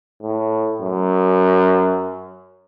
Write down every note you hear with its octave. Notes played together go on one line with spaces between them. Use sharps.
A2
F#2